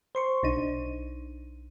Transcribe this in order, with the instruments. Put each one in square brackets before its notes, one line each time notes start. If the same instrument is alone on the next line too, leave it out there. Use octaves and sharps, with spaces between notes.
[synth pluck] C5 C6 C#6
B1 D4 D#4 D#7